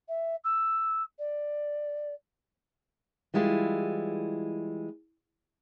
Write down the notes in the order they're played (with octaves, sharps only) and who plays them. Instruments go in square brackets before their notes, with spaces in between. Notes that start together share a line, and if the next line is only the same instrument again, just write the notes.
[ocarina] E5
E6
D5
[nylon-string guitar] E3 G3 G#3 E4 F4